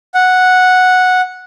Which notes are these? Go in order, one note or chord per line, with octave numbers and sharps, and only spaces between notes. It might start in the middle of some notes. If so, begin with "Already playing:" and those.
F#5